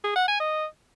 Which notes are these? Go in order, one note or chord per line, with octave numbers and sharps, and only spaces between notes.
G#4
F#5
G#5
D#5